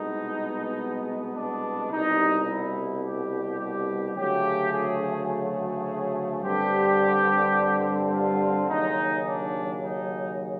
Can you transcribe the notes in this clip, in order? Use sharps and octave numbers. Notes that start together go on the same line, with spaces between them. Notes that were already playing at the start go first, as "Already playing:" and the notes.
Already playing: C2 B2 G#3 B3 D#4
D4
C2 B2 G3 D#4
E4
G4
G4
D2 C#3 F#3 A3 G4
G#4
G#4
G2 D3 G3 C4 G4
F4
D#2 C#3 F#3 D#4
D4
D#4